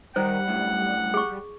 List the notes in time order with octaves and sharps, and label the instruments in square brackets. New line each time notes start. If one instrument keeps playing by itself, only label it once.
[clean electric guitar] D#3 A#4 [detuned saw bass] G3 [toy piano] C5 [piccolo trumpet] F#5
[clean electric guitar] F#2 A2
[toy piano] G#4 C#6